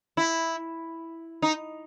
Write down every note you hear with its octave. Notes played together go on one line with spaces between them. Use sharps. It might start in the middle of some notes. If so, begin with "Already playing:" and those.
E4
D#4